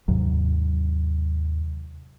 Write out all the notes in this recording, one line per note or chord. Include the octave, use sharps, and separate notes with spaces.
D#2 G#2 C3 F#3